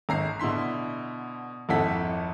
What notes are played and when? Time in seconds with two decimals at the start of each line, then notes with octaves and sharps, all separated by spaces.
0.09 G#1 A#5 C7
0.40 B2 D3 E4 C6 B6
1.69 G#1 F2 E4 A4 F#5 B6